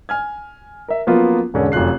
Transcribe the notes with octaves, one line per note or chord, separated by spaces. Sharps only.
G#5 F6 G#6
A#4 E5
F3 F#3 A#3 B3 C#4 F4
E1 G#2 D3 C#4 G#4 A#4
F1 F#2 F4 F#6 C7